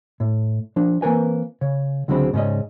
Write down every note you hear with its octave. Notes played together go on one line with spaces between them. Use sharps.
A2
F3 D4
E3 A#3 C4 A#4 B4 G#5
C#3 C#5
C#2 D3 F#3 G#3 C4 B5
G#2 C#3 B3 C#4 D5 D#5